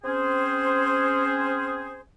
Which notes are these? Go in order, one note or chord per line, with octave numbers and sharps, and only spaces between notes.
C4 C#4 G#4 C5